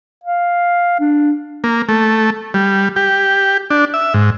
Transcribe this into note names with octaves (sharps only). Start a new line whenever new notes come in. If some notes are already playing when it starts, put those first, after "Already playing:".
F5
D4
A#3
A3
G3
G4
D4
E5
G#2